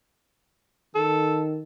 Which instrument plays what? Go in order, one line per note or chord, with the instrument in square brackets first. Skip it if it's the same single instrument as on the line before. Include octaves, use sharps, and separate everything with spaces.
[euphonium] D#3 [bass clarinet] A4